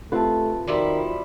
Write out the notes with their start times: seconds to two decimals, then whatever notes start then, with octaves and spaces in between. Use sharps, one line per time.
0.12 A3 C4 F4 G4 B4 E5 A5
0.67 D#3 F3 G3 E4 F#4